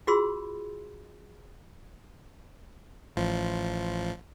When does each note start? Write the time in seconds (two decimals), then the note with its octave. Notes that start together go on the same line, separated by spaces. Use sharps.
0.07 F4 F#4 G#4 B5 C6 E6
3.16 A1 F3